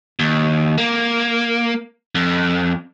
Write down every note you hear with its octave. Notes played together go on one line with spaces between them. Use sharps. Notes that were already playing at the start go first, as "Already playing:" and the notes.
D#2
A#3
F2